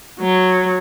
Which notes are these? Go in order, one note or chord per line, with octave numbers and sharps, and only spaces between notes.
F#3